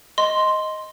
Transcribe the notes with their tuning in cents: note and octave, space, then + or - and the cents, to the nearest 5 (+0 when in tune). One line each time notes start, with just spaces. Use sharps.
D#5 +5 C6 +0